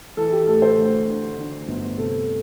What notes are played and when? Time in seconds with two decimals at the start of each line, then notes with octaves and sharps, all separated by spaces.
0.17 E3 A4
0.32 G4
0.47 A1 A4
0.62 C5
0.78 D2
1.08 D3
1.38 D3
1.68 G1
1.98 C3 A4